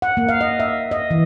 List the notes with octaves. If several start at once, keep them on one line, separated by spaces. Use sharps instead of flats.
F#5
A#3
F5
D#5
E5
D#5
E3